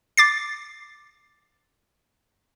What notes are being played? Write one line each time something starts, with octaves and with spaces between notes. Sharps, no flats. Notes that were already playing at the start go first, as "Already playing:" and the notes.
D6 A6 C7